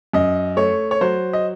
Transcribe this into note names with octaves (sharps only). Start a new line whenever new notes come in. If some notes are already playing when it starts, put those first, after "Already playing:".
F#2 D#5
A3 C#5
C#5
F#3 C5
D#5